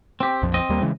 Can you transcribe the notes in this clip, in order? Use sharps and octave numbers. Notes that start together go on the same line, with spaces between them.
C4 G4
A#1 F2 F3
C4 D#5
D#2 G3 A#3
C#3 E3 G#3